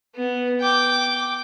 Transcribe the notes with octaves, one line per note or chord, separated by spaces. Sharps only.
B3
G5 D6